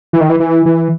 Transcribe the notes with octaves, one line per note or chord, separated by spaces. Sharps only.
E3
D#3
E3
E3
E3